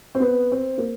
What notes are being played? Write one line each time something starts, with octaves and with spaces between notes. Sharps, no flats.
C4
B3
C4
A#3